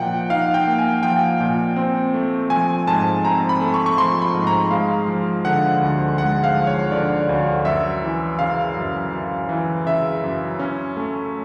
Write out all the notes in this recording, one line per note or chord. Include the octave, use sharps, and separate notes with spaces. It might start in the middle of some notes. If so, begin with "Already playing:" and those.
Already playing: A#2 F3 A#3 D#4 F#5 G5
D#4 F5
G5
A#3
G#5
F3 G5
A#2
C4
A3
F3 G#5
G#2 A5
C4 A#5
B5
A3
C#6
C#6
F3 C6
B5
G#2
A#5
G#3 F5
F3
D3 F#5
D2
G#3 F#5
F5
F3
C#5
D3 D5
D2
F#2 E5
E3
C#3 F5
F#2
F#2
E3
C#3 E5
F#2
C#4
A3